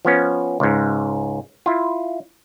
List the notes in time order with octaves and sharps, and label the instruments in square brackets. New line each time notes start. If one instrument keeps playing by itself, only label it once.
[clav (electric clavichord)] F3 B3 C#4
C#2 G#2
E4 F4